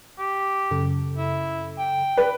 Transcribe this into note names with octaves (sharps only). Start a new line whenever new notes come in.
G4
F#2 C#3 A4
E4
G5
B4 D5